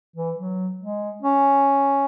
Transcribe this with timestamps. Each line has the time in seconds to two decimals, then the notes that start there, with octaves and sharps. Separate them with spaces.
0.16 E3
0.38 F#3
0.80 G#3
1.23 C#4